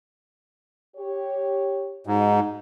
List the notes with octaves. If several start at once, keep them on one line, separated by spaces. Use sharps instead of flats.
G4 C#5
G#2 D#4 F#4